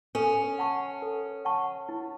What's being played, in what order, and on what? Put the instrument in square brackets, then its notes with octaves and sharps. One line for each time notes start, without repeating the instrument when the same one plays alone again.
[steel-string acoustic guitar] C#4 [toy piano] A4
[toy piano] F#5 A5 C#6
A4
F#5 A5 C#6
E4